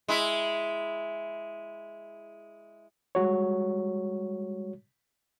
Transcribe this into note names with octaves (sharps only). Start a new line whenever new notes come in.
G#3 E4
G3 G#3 F#4 C#5